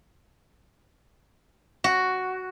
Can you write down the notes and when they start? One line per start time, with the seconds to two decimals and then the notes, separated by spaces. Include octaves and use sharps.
1.84 F#4